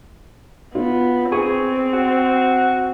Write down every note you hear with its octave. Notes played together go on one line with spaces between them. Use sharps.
B3 F4
C4 G#4 C#6
F#4